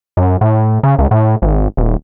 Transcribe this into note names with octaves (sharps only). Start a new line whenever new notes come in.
F#2
A2
C#3
C#2
A2
G#1
D#1